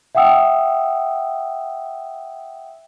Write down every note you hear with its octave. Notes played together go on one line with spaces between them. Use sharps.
E5 F#5 G5 D#6 E6